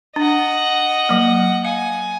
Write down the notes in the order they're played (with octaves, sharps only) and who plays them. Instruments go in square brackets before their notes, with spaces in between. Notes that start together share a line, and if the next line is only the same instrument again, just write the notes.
[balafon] D4 [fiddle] D#5 F#5
[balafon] F#3 A#3
[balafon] F5 [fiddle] G#5